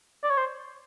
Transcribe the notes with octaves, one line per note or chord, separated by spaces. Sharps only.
D5
C#5
C5